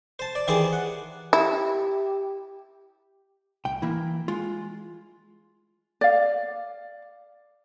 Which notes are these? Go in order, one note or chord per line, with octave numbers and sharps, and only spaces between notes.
C5 A5
D5
D#3 E3 G4 G#4 C5 D5
F#5
E4 G4
C2 G5
E3 A#3 E4
G#3 F4
D5 F5